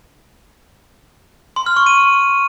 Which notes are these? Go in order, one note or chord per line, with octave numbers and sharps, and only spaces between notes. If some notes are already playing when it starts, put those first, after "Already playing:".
C6
F6
C#6
D#7